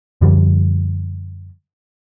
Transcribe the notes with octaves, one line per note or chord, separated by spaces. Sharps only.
F#2 D3 F3 G3